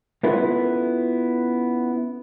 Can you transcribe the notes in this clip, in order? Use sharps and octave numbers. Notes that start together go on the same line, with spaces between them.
B3 C#4 E4 F4 A4 B4